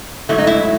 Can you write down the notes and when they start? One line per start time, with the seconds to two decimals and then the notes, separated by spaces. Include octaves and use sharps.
0.29 G#2 F#3 A3 E4
0.38 D#4
0.47 E4